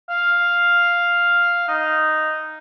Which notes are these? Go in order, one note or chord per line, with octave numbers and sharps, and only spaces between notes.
F5
D#4